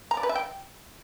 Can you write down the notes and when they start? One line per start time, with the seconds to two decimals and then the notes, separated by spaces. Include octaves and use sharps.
0.11 A#5
0.17 D5
0.23 B4
0.29 E5
0.35 G5